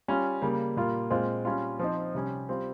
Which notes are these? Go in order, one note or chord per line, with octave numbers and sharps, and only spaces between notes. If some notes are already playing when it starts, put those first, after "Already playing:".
G3 C#4 F4
C#3 G3 A#3
A#2 G3 A#3 F4
A#2 G#3 C4 F4
G3 C#4 F4
F3 C4 D#4
C3 G3 C#4
G3 C4 F4